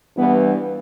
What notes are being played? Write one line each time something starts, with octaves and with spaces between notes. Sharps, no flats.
G2 E3 G3 B3